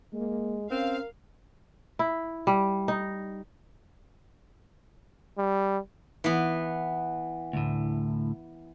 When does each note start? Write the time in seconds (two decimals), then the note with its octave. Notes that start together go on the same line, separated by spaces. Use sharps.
0.13 G#3 A#3
0.71 C4 C#4 A#4 F5
1.99 E4
2.47 G3
2.88 D#4
5.38 G3
6.24 E3 B3
7.53 D2 A2